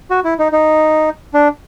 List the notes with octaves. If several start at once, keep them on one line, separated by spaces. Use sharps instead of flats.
F#4
E4
D#4
D#4
D4